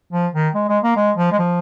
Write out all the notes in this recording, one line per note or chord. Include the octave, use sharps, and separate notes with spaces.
F3
D#3
G#3
G#3
A#3
G#3
F3
G#3
F3